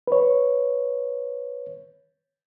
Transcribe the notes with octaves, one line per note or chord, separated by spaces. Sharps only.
B4 C#5